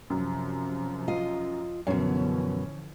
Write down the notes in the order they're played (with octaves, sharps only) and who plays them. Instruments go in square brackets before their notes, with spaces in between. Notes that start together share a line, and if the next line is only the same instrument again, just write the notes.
[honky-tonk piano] F#2 [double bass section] C3 F3
[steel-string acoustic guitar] F4 D#5
[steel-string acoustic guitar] F#2 B2 [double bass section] D3 E3 F3 [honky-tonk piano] C#4